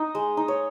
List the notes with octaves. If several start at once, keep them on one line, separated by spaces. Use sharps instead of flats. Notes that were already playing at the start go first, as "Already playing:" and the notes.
Already playing: D#4 D#5
G#3
D#4
C#5